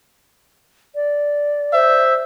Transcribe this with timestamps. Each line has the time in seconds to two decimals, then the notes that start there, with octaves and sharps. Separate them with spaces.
0.95 D5
1.73 C5 E5